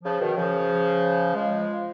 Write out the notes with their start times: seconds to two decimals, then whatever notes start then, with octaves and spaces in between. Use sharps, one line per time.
0.04 C#3 F3
0.20 B2 D#3
0.36 C#3 F3
1.34 F3 G#3